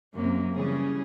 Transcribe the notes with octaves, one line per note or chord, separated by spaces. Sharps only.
F#2 C3 A#3 C#4
C#3 E3 G3 C#4 G#4